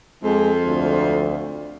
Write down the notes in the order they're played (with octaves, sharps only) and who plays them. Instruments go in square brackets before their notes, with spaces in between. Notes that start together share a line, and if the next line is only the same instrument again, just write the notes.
[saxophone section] F2 [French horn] G#3
[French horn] D2